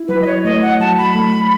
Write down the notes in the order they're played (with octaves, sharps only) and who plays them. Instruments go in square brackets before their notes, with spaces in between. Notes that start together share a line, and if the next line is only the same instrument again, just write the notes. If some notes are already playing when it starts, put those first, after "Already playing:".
Already playing: [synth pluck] E4
[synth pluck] F#3 [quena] B4
[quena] D#5
C#5
[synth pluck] A3 [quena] D#5
[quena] F#5
[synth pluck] F#3 [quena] A5
[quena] B5
[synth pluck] A3